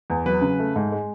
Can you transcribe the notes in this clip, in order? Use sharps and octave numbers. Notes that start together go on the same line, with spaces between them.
E2
F#3 B4
C#3
A3
G#2
G#3